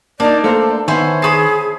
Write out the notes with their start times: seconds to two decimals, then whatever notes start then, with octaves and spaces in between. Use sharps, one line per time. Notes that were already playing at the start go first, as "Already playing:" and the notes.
0.20 A#3 D4 D#4 D5
0.44 A3 A#3 A4 A#4 C5 F5
0.88 D#3 B3 E4 C5 C#5 E5 F#5 G#5
1.22 G#4 A5 B5 C#6 D#6 C7